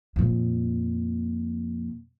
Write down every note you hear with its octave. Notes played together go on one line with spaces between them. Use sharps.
F2 A#2